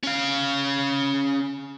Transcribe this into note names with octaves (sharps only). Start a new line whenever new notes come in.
C#4 F5